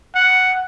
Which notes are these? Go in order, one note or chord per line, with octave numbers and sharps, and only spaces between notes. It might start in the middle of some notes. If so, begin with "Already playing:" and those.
F#5